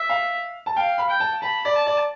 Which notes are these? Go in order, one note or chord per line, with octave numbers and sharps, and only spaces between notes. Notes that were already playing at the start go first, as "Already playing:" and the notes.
Already playing: E5
F5
A5
F5 G5
B5
G5
A5
A5 B5
D5
A5
D5